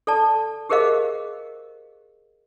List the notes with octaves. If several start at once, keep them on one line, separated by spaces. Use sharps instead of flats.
A4 D5 A5
G4 G#4 A#4 C5 D#5 F5